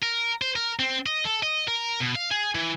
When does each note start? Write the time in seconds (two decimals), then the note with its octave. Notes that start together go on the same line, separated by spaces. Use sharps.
0.03 A#4
0.42 C5
0.56 A#4
0.79 C4
1.06 D#5
1.25 A4
1.43 D#5
1.68 A#4
2.00 B2
2.15 F5
2.31 G#4
2.55 E3